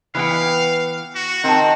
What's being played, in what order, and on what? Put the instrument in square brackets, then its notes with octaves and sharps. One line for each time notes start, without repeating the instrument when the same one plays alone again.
[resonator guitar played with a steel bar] E3 B3 G5 [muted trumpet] F5
[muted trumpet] F#4
[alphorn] D#3 [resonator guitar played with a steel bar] C4 A5